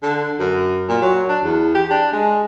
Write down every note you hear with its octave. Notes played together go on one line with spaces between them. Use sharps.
D3
F#2
A#2
F#3
D4
E2
G4
D4
G#3